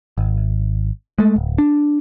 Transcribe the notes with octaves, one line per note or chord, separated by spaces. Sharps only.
G#1
G#3 A3
D1
D4